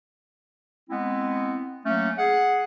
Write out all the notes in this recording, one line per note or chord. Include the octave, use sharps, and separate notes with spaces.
G#3 B3 C4 E4
F#3 A3 A#3 C#4
G#4 F#5